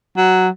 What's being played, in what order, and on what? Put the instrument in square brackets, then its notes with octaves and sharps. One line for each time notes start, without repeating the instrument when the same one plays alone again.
[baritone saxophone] F#3